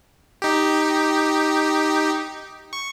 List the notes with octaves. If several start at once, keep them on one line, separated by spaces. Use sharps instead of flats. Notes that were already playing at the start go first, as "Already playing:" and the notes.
D#4 G4
C#6